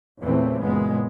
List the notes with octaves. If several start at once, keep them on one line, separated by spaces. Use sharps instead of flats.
E2 A#2 C#3 E3 A3 C4
F#1 A#2 G#3 B3